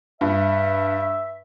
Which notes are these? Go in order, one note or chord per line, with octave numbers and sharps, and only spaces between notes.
G2 E5